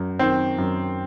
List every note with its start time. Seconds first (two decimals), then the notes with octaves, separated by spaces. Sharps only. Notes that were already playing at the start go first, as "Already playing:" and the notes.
Already playing: F#2
0.19 D#3 C4
0.58 F#2